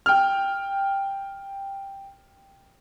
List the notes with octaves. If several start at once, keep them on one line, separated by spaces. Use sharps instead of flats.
G5 F6